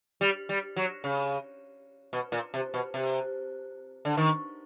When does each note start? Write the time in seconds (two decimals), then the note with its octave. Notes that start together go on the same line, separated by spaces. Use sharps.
0.21 G3
0.49 G3
0.76 F#3
1.04 C#3
2.13 B2
2.32 A#2
2.54 C3
2.74 B2
2.94 C3
4.05 D3
4.17 D#3